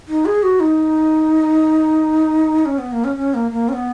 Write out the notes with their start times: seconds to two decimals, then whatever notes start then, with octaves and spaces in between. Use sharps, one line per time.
0.08 D#4
0.25 G#4
0.43 F#4
0.60 D#4
2.65 C#4
2.78 B3
2.92 A#3
3.04 C#4
3.17 C#4
3.34 A#3
3.51 A#3
3.69 C#4
3.73 B3